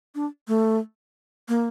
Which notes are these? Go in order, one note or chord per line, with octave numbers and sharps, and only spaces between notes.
D4
A3
A#3